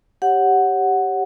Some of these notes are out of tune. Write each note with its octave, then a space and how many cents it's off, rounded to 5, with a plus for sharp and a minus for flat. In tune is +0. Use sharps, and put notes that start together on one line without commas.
G4 +0 C#5 -15 F#5 +0